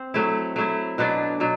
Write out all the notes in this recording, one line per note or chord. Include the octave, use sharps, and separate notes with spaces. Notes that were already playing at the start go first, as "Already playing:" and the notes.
Already playing: C4
F#3 A3 E4
F#3 A3 E4
B2 F#3 B3 D4
B2 F#3